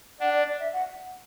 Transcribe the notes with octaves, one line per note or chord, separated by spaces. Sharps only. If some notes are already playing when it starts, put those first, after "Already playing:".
D4 F#5
D5
D5
E5
F#5